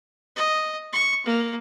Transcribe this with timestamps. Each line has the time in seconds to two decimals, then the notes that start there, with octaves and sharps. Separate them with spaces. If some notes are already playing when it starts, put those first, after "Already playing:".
0.36 D#5
0.93 C#6
1.26 A#3